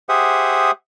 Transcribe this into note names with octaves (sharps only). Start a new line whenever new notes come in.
G4 G#4 C5 E5 F#5 D#6